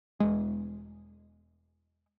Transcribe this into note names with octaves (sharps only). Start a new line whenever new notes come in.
E1 G#3